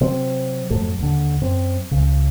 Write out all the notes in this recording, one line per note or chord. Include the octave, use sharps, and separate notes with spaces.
C3 F#3 C4
F2 G#2 F#3 A3
D#2 D3
F#2 C4
C#2 C#3